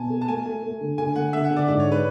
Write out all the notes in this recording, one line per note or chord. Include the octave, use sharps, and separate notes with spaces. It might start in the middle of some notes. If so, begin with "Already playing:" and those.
Already playing: B2 G#5 A5
A4
A5
A3 G#5
A3
A3
D3
D3 G#5
A3 F#5
D3 E5
F#5
D3
D5
G#2 D5
C#5
G#3
B4